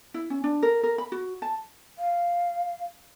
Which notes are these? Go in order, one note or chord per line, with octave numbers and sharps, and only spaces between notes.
E4
C#4
D4
A#4
A#4
B5
F#4
A5
F5